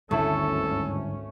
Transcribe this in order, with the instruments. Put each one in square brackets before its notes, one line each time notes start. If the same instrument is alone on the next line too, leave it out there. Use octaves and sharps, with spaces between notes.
[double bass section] G#1 D2 C#4 [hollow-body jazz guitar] G2 D3 E4 [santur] A3 [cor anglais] A4